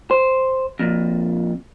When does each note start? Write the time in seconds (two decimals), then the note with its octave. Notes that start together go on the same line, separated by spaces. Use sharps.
0.11 C5
0.79 F2 A#2